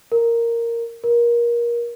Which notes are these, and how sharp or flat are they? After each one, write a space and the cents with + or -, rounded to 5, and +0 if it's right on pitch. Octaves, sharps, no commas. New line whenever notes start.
A#4 -5
A#4 +25